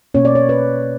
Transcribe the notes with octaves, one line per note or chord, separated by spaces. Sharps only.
B2 A#3 C#4 C#5
D5
C#5
B4